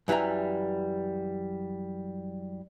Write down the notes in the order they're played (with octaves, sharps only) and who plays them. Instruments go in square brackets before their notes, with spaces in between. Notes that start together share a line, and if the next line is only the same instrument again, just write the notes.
[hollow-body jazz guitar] F#2 E3 G3 E5 A#5